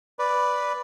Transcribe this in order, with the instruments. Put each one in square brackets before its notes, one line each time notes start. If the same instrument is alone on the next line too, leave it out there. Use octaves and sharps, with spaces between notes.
[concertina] B4 D5